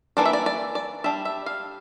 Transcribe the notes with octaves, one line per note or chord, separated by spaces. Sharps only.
E3 A#3 D4 D5
E5
D5
D5
D5
G3 D4 E5
E5
F5